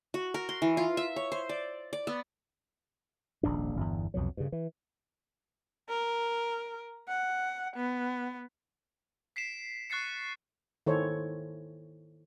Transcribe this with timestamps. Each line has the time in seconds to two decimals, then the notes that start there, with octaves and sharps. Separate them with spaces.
0.14 F#4
0.34 A#4
0.49 C6
0.62 E3
0.77 F4
0.97 E5
1.16 C#5
1.32 C5
1.49 D5
1.93 D5
2.07 B3
3.43 D#1 A#1 G#2 D4
3.76 G1 E2
4.14 C2 F2 B2 F#3
4.37 G2 C#3
4.52 E3
5.89 A#4
7.08 F#5
7.76 B3
9.36 B6 C7 D7 E7
9.90 C#6 F#6 A6 C7 C#7
10.86 D#3 E4 A4 C5 C#5